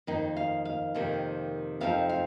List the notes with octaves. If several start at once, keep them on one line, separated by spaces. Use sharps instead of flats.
F2 D#3 A#3 D#4
F5
F5
F2 C3 D#3 A#3
F2 C3 F3 C4 D#4 F5
F5